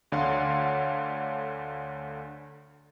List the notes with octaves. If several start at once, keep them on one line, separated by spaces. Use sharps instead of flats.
D2 D3 C#5 F5 F#5 C6